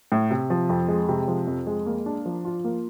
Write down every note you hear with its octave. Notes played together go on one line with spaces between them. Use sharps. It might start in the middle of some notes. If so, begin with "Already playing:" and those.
A2
C3
F3
F2
G#3
C3
F3
F2
G#3
A#3
D4
F3
F4
A#3